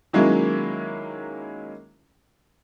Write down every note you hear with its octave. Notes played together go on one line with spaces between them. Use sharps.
D#3 F#3 G#3 A#3 C#4 E4